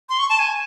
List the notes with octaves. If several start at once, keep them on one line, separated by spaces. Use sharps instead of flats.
C6
C#6
A5
G#5